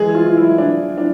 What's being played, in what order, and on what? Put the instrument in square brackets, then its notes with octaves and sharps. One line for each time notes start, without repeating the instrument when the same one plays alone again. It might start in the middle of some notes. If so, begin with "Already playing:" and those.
Already playing: [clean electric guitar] E3 G#3 [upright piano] G#4
[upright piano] F4
F4
E4
D4
D4